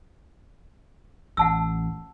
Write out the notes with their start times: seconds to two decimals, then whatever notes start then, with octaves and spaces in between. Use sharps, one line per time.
1.37 A1 F#5 A5 E6